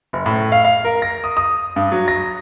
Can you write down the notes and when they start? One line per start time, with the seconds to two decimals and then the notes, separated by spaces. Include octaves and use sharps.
0.13 F#1
0.26 A2
0.52 F5
0.65 F5
0.84 A#4
1.02 A#6
1.24 D#6
1.37 D#6
1.76 G2
1.92 F#3
2.08 A#6